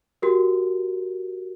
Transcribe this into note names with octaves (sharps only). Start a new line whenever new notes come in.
F#4 G4 A#4